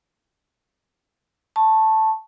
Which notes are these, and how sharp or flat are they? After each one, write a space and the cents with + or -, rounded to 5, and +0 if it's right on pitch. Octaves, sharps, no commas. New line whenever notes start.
A5 +0 C#6 -25